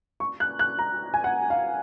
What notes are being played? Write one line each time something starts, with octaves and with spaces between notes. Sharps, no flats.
C#6
F#6
F#6
A#5
G#5
F#5
F5